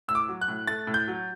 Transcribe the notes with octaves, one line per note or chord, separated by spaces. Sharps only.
A2 E6
D6
F#3
F#6
A2
A3 A6
A2
G6
F#3